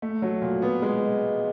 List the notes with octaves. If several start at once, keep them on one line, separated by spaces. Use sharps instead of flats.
A3
F#3
A#2
B3
G#3